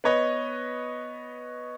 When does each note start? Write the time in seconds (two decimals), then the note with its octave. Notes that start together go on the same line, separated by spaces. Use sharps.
0.04 B3 B4 C#5 D#5